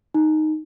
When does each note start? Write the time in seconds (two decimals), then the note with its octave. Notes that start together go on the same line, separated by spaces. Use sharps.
0.14 D#4